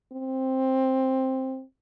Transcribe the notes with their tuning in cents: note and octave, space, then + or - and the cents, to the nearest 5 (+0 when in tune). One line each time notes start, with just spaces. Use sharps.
C4 +10